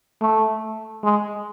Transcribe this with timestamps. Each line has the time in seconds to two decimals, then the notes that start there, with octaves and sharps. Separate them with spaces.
0.21 A3
1.03 G#3